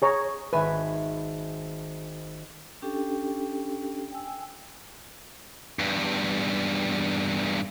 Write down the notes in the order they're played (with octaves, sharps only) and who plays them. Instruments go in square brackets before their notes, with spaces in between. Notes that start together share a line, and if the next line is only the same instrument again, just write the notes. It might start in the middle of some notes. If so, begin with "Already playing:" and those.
[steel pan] G#4 C#5 A#5
[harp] G#1 E5 G#5 [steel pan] B4
[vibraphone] C#4 D4 G4 A4 G5
G5 G#5 E6
[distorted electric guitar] E2 G2